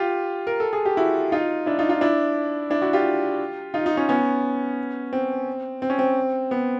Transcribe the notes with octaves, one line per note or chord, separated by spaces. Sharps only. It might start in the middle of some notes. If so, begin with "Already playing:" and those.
Already playing: F4 G4
A#4
A4
G#4
G4
E4 F#4
D#4 F4
D4 E4
D#4 F4
D#4 F4
D4 E4
D4 E4
E4 F#4
F4 G4
D#4 F4
D#4 F4
C#4 D#4
B3 C#4
C4
C4
C#4
C4
B3